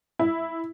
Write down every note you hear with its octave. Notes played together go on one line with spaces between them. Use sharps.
E4